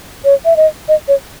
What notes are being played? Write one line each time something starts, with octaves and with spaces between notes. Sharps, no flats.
C#5
E5
D#5
D#5
C#5